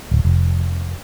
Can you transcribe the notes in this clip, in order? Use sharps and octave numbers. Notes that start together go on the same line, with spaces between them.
D1
F1